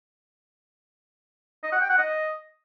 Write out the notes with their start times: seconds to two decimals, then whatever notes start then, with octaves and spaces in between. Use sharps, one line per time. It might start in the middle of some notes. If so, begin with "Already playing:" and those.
1.63 D#5
1.72 F#5
1.81 G5
1.90 F#5
1.98 D#5